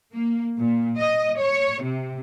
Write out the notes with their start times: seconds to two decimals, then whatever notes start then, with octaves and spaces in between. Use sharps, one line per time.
0.13 A#3
0.58 A#2
0.98 D#5
1.40 C#5
1.82 C3